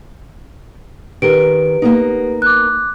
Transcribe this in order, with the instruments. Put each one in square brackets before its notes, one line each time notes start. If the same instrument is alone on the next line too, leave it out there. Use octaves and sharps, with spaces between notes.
[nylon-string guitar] D#3 A#4 [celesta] G4 B4 D7
[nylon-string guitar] A#3 B3 D#4
[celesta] D6 F#6